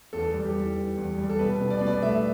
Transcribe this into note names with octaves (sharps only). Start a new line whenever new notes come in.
E2 A4
G3
G4
E2
E3
E2
G3
A4
B2 B4
B2
D5
B2 B4
D5
A3 E5